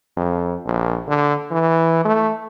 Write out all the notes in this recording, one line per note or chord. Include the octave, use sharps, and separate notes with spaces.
F2
A#1
D3
E3
A3